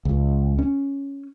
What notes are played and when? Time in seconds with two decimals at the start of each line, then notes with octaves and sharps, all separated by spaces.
0.05 C#2
0.59 C#4